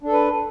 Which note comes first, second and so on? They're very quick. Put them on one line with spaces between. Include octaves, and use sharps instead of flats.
D4 A4 B4